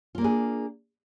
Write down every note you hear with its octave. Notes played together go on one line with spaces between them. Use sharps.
A#3 D4 F4 G#4